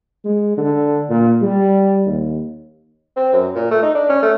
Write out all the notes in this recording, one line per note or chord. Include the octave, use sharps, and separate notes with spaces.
G#3
D3
A#2
G3
D#2
C4
F#2
A#2
A3
D#4
D4
C#4
A3